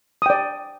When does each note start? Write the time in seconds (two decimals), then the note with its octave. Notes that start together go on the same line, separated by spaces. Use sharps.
0.22 D#6
0.26 G5
0.30 D5